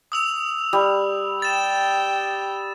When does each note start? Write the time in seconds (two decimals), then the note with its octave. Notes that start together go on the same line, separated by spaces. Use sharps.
0.12 D#6 E6 F7
0.73 G3
1.42 G5 A6 E7